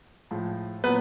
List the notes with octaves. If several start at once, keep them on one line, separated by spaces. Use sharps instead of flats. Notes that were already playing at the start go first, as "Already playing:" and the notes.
A2 F3 G#3
A#2 F#3 B3 B4